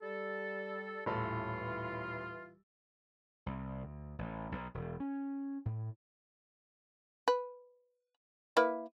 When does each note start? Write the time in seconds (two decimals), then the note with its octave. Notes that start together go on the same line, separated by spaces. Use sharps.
0.02 G3 A4
1.06 D#1 A2 E3 E4 F4 A4
3.46 C2
3.83 D2
4.19 A1
4.52 B1
4.74 E1
5.00 C#4
5.65 A2
7.28 B4
8.57 A#3 E4 B4